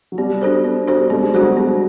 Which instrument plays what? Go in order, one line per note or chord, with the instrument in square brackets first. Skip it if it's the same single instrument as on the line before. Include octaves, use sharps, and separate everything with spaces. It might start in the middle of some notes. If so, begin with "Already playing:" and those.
[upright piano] F#3
[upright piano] G3 [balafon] B3
[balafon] D4 F#4 A4 C5
B3
D4 F#4 A4 C5
[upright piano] G3
[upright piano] G#3 [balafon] B3
[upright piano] G3
[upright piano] F#3 [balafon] D4 F#4 A4 C5
[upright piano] G3 [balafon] B3